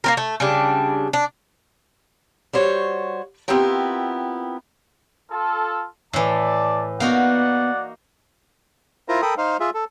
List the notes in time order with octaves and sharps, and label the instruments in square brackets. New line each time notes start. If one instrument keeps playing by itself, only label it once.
[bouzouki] A#3 C4 A#4
A3
C#3 G3 D4
D4
[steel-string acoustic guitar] G3 F#4 C5 C#5
B3 C4 E4 F4 G4 A#4
[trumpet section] F4 A4
[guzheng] A2 E3 [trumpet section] D5 A5
[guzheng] A#3 D#4 F#4 [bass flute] B3 [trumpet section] D5 F#5
[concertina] E4 F4 A#4 C5 A#5
A4 A#4 G5 B5 D#6
D#4 C5 F5
F4 G#4 E5
A4